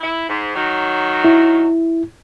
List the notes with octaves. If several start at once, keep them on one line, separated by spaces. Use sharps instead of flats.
E4
G#2
D#3 F#3
E4